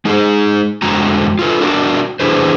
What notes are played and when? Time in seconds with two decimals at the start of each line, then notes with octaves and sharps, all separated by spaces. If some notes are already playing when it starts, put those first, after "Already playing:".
0.05 G#3 D#4 G#4
0.82 F2 D3 G#3 F#4 A#5
1.39 F4 F#4 A4 B4
1.60 D4 F#4 A#4 D5
2.20 E2 D4 E4 G#4 B4 C5